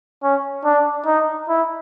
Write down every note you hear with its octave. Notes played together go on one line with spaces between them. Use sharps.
C#4
D4
D#4
E4